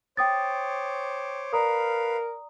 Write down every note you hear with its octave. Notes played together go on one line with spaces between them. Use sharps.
C5 C#5 G5 D6 D#6 A6
A#4 B4 D5 F5 A#5 D#6